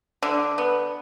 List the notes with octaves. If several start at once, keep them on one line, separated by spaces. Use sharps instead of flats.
D3
B3